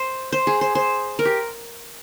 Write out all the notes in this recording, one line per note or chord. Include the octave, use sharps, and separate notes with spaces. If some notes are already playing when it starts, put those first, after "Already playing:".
Already playing: C5
C5
G#4
C5
C5
A#4
G4